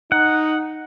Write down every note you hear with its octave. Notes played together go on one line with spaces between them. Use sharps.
D#4 F#5